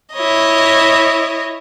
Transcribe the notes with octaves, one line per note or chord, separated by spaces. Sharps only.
E4 C#5 D#5